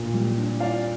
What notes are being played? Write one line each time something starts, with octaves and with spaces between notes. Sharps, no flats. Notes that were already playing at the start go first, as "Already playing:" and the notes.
Already playing: A#2 D4 F4
G3
D4
F4 D5 F5